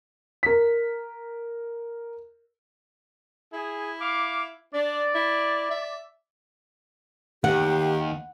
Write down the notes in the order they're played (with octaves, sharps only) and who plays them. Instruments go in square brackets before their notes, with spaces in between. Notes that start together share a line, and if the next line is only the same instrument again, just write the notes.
[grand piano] A#4 B6
[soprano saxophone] E4 [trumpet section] G#4
[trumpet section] F5 D6
[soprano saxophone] D4 [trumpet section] D5
[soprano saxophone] E4
E5
[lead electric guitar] D#2 [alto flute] G4 [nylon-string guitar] F#5